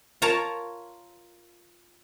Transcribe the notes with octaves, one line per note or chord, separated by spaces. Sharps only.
F4 A#4 C#5 A5 A#5